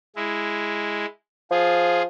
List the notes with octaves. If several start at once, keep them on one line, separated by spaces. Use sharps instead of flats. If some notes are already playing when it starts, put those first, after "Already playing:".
G#3 E4
F3 F4 G#4